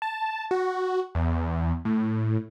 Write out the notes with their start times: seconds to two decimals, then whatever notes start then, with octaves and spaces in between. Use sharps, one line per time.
0.02 A5
0.51 F#4
1.15 E2
1.85 A2